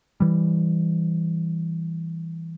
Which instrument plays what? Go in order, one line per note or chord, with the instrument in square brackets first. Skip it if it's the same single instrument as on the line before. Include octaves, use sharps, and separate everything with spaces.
[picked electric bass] E3 G3